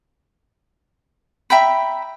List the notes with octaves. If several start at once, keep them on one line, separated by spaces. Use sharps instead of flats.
E5 G5 A#5 B5